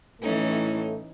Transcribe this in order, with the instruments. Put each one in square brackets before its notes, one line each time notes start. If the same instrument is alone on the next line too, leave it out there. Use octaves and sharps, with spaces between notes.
[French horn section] A2 A3 [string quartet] E3 C#4 D#4